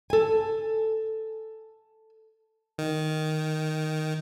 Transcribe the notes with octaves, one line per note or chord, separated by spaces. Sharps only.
A4 G#5
D#3